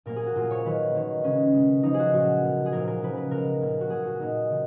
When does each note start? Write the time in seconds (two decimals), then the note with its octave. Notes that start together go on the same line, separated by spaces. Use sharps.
0.06 A#2 F#3 A#3 A#4
0.16 G#4
0.26 F#4
0.36 A#2 F#3 A#3 F4
0.51 C#5
0.65 D#3 F#3 A#3 B4
0.95 D#3 A#3
1.24 C#3 G#3 C#4
1.54 B2 G#3
1.83 C#3 F3 A#3 D#4
1.94 F#4 G#4
2.13 A#2 F#3 A#3 F#4
2.43 B2 A#3
2.66 G#4
2.72 A#2 F3 A#3 A#4
2.87 A#4
3.00 C#3 F3 A#3 B4
3.17 B4
3.31 B2 G#3 A#4
3.61 A#2 F#3 A#3
3.81 F#4
3.90 A#2 F#3 A#3 G#4
4.06 F#4
4.20 A#2 F#3 A#3 D#4
4.50 C#3 F3 A#3